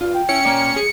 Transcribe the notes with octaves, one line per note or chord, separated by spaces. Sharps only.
G2 F4
G5
C#4 E4 C#7
A#3 D5
G#4